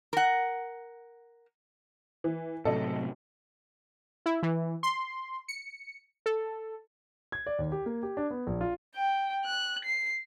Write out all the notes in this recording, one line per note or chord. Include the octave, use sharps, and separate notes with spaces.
A#4 F#5
E3
A2 C3 F#3 A4 D#5
E4
E3
C6
C#7
A4
G#6
D5
D#2
G4
A#3
G4
D4
B3
A#1
F4
G5
F#6
C7